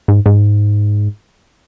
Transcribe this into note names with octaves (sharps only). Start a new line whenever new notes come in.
G#2
G#2